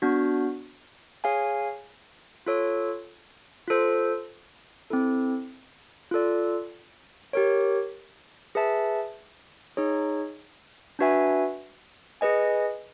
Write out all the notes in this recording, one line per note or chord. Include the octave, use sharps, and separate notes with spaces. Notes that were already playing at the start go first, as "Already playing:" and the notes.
B3 D4 F#4
G#4 C#5 F5 G#5
F4 A4 C#5
F4 A4 C5
C4 E4 A4
F4 A4 D5
G4 A#4 C#5
G#4 B4 E5 A5
D#4 G#4 C#5
D4 F#4 B4 E5 G#5
G#4 B4 D#5 G#5